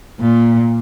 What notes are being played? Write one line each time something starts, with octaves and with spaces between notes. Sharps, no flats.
A#2